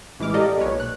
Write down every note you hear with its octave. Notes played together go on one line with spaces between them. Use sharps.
A1 E3 G#3 D6 F6
G4 A4 A#4 D5 D#5 F5
B1 A#2 B4 C#5
F#6